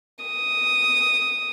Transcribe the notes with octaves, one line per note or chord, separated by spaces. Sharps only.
D#6